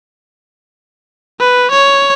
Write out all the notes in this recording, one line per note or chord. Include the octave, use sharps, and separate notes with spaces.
B4
C#5